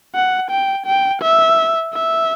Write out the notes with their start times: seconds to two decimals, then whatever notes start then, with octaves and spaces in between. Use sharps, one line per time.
0.15 F#5
0.50 G5
0.86 G5
1.22 E5
1.93 E5